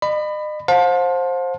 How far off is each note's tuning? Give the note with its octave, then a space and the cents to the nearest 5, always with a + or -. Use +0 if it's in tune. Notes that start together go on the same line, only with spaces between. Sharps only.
D#5 -40 B5 +15
C5 +15 F5 +40 A5 +0